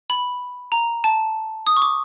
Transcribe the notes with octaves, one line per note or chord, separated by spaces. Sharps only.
B5
A#5
A5
D#6
C#6
D6